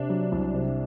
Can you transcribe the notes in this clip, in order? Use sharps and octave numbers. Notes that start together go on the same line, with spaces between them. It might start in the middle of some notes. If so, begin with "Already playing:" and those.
Already playing: C3 D4
F#3
C2
C3